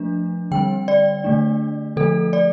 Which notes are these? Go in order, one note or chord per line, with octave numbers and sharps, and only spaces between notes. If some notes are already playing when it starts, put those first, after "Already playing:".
Already playing: F3 A3 D4
D3 G3 C4 G5
D5
D3 A3 D4
D3 F3 A3 A4
D5